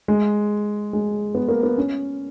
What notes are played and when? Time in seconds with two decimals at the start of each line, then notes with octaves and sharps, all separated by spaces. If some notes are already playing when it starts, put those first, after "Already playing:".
0.08 G#3
0.93 G#3
1.35 B3
1.48 A#3
1.63 B3
1.78 C#4